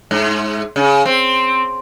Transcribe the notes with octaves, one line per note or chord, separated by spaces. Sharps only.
G#2
C#3
C4